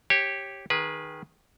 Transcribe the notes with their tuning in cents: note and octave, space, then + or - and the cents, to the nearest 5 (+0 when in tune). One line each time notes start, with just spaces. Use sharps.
G4 +0 C#5 -20
D#3 +0 G#4 +0 B4 -25